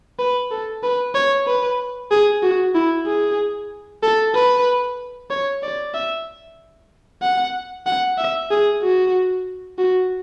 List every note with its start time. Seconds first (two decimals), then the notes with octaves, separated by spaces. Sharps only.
0.19 B4
0.51 A4
0.83 B4
1.15 C#5
1.47 B4
2.11 G#4
2.43 F#4
2.75 E4
3.06 G#4
4.03 A4
4.35 B4
5.30 C#5
5.63 D5
5.94 E5
7.22 F#5
7.86 F#5
8.18 E5
8.51 G#4
8.82 F#4
9.78 F#4